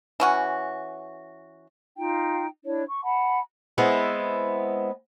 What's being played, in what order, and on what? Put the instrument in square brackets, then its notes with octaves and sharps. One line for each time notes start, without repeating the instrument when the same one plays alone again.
[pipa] E3 C#4 F#4
[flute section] D#4 F4 G5
D4 E4 C#5
C#6
F#5 A5 B5
[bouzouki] G#3 B3 C4 E4